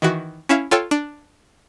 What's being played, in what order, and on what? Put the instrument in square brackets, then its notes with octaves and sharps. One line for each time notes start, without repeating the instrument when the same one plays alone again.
[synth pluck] D#3 E3 F#4
C#4 E4 E5 F5
F4 A4 C#5 G5 E6 F6
D4